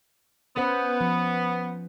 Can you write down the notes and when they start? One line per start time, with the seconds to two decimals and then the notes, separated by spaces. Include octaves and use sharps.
0.57 B3 C#4 B4 C5
1.01 F3